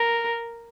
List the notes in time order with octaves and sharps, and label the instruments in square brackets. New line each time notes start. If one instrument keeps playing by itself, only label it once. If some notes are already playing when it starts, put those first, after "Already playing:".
Already playing: [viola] A#4